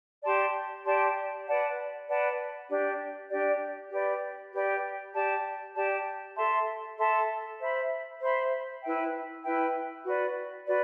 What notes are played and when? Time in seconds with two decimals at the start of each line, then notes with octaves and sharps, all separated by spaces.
0.23 G4 D5 A5 C6
0.84 G4 D5 A5 C6
1.46 B4 D5 F#5 A5
2.07 B4 D5 F#5 A5
2.69 D4 G4 D5
3.30 D4 G4 D5
3.90 G4 B4 D5
4.52 G4 B4 D5
5.14 G4 D5 A5
5.74 G4 D5 A5
6.36 A4 E5 A5 C6
6.97 A4 E5 A5 C6
7.58 C5 E5 B5
8.20 C5 E5 B5
8.81 E4 B4 E5 G5
9.43 E4 B4 E5 G5
10.04 F#4 B4 D5
10.66 F#4 B4 D5